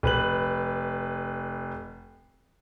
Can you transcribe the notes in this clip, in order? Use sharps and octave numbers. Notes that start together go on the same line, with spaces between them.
F1 B4 F#7